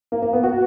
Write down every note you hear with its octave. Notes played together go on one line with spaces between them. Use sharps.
A#3
A#3
B3
F#4